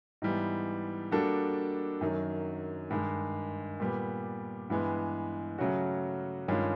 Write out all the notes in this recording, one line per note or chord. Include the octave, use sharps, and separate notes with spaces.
G#2 E3 G3 B3
G3 A#3 D4 F#4 A4
F#2 D#3 F#3
G2 D#3 G#3
A#2 G3 B3
G2 E3 G#3 B3
C#3 F#3 A3 C#4 F#4
G2 D#3 G#3 C#4 F4